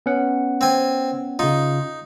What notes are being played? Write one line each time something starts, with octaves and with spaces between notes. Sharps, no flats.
B3 C#4 F#5
C4 G#5
C#3 D#4 F4